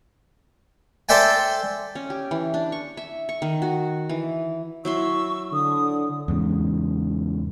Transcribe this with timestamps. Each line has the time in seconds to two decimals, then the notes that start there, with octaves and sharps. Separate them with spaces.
1.09 A4 C5 D5 E5 G5 G#5
1.95 C#4
2.10 G4
2.31 E3
2.54 D4
2.72 C#6
2.97 E5
3.29 C#6
3.42 D#3
3.62 F#4
4.09 E3
4.85 F#3 E4 C6 C#6 E6
5.52 D3 D#6
6.28 E2 G#2 C#3